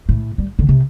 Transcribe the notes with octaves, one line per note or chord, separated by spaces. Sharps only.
A2
G3
D3
C3